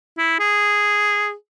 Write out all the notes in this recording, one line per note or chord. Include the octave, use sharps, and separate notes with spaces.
E4
G#4